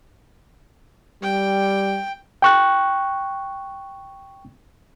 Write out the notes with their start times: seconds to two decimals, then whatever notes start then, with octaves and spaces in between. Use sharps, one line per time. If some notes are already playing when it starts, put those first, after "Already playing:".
1.22 G3 G5
2.42 G5 C#6 F#6